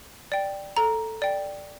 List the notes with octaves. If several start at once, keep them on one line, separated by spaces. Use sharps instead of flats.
D5 G5
A4 A#5
D5 G5